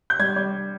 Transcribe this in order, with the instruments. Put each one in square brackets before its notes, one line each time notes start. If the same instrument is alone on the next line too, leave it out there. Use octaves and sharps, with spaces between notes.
[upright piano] G6
G3 G#6
G3